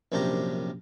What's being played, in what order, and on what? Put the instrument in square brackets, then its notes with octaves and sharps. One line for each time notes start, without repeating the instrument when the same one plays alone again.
[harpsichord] A#1 F#2 C3 D4 G4 A#5